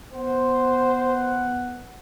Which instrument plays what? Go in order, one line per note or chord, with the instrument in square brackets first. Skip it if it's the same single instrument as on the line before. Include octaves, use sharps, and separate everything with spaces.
[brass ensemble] B3 F#5 [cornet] C5